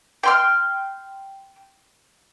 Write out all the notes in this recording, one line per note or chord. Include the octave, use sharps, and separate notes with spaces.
G5 C6 F6